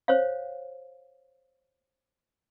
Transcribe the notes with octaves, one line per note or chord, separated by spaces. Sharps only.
C5 C#5 F5